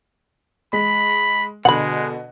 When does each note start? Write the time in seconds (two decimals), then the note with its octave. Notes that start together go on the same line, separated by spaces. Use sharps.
0.73 G#3 B5
1.65 B2 D3 G#3 F#5 B5